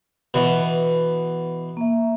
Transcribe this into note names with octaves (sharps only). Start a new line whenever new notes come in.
B2 E3
A#3 E5